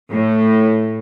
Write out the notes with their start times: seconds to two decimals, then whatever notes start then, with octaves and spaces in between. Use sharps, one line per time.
0.12 A2